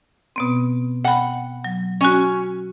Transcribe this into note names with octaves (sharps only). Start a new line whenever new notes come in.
B2 B3 C4
F#5 G5 B5
F#3
C#4 F#4 G#5 C#6